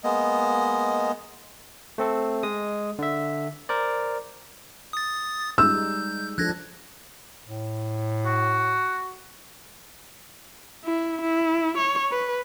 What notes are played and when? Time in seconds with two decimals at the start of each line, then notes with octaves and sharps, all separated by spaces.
0.04 G#3 A#3 B3 D#5
1.98 A3 C4 A4
2.43 G#3 D#5 D#6
2.99 D3 E5
3.69 A#4 C5 D5
4.93 D#6 A6
5.58 G3 G#3 D#4 E6 G6
6.38 F3 D4 A4 F#6 G#6 A#6
7.45 A2
8.26 F#4
10.84 E4
11.21 E4
11.78 C#5
12.11 B4